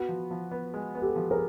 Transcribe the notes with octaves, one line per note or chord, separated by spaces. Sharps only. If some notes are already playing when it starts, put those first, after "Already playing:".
Already playing: B3 F#4
F3
F3
B3
G#3
B3
G4 A4
F3
G#4 A#4